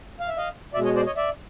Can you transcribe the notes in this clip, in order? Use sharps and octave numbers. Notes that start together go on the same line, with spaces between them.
F5
E5
D#5 F5
B2 G#3 D5 E5
C#5 D#5
C5 D5
C#5 D#5
D5 E5